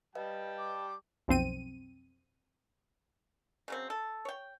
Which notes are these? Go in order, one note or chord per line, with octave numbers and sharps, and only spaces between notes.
G3 B4 D#5 F5 G5 A5
D6
B1 F2 C4 D#7
C#3 F#3 C4
A4
C#5 G5